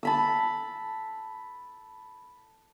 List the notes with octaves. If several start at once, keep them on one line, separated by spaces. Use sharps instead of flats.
A5 B5 E6